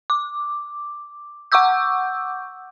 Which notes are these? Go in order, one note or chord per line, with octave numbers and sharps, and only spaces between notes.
D6
F#5 C#6 D6 E6 G6